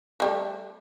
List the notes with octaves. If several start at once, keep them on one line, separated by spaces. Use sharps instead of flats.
F3 G3 A3